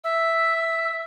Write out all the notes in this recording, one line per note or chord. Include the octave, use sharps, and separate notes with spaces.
E5 E6